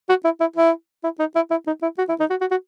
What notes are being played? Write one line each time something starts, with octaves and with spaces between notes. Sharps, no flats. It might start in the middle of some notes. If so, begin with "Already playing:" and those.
F#4
E4
E4
E4
E4
D#4
E4
E4
D#4
E4
F#4
E4
D#4
F#4
F#4
F#4